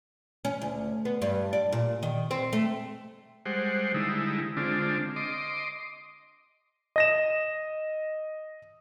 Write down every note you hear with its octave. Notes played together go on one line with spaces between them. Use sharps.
C#4
D2
B3
G2
D5
A#2
D#3
C4
A3
G3 G#3 C5 F#5
D3 G3 G#3 D#4 E4
D3 G#3 C4 D4 F4
D#5 C6 D6
D#5 A#6 E7